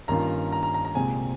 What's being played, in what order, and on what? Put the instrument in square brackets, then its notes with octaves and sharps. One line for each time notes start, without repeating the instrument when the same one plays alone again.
[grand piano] G2 D#3 A#3 C#4 F4 [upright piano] A#5
[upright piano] A#5
A#5
A#5
A#5
[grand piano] C2 A#2 G#3 C4 [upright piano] G#5